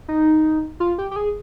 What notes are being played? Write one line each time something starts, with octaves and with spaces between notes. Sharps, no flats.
D#4
F4
G4
G4
G#4